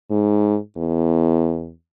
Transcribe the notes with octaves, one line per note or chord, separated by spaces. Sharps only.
G#2
E2